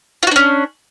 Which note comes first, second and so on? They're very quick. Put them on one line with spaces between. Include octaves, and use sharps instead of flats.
F4 F#4 D4 C#4